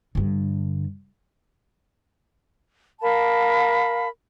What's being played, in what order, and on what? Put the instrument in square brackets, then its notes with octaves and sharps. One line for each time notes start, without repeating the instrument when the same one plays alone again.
[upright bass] G2 D3
[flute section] A#4 F5 A5 B5